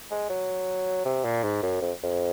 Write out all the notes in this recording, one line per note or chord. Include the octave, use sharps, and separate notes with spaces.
G#3
F#3
C3
A#2
G#2
F#2
F2
F2